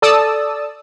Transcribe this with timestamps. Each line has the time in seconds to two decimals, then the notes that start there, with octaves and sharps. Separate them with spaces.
0.02 A4 D5 A5 D#6 E6